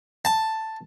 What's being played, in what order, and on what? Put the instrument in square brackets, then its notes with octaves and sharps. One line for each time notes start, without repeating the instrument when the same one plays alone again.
[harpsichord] A5